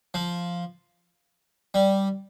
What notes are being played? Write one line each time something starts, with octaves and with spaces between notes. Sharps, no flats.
F3
G3